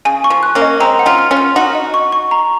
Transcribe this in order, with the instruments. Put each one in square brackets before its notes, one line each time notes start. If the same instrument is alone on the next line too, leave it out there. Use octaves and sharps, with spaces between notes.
[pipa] C#3 [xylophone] G#5
[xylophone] C#6
[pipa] F3
[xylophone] F#6
[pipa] A#3 C#4
[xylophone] D#5
[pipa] G#3 C4 [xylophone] A#5
[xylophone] F#5
[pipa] C#4 F4
[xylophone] F6
[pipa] C#4 F4
[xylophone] F6
[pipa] D#4 F#4 [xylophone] F#5
[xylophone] D#5
C#6
C#6
A#5